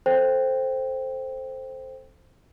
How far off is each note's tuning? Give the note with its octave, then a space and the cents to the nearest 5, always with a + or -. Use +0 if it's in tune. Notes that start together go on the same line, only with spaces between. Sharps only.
A4 +0 C5 +0 G5 +0